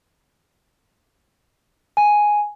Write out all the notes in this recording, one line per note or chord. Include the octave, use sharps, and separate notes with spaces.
G#5